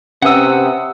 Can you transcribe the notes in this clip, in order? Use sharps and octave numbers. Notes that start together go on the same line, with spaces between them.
C3 C#4 B4 F#5 D#6 E6